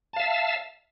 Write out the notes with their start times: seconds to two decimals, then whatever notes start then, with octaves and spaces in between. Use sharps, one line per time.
0.13 A5
0.16 F5
0.20 E5